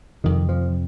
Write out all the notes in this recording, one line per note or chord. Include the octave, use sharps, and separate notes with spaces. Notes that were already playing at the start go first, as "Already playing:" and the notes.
F2 C3 D#3
F3